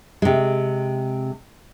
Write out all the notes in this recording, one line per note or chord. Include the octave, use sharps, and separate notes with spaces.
C3 G#3